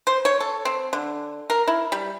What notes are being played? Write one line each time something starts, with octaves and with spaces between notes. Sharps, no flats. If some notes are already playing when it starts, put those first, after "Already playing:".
C5
C#5
A4
C4
D3
A#4
E4
G3